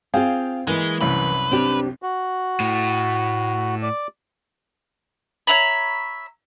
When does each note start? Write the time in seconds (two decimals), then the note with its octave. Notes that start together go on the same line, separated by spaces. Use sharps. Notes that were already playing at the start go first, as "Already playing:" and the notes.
0.14 C4 F4 G#4 F5 G5
0.67 E3 G#3 A#3 E4
1.01 C2 F#2 B4
1.51 C4 D4 G4
2.02 F#4
2.60 A2
3.82 D5
5.47 C#5 E5 A#5 B5